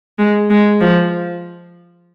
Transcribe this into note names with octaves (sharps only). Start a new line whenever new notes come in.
G#3
G#3
F3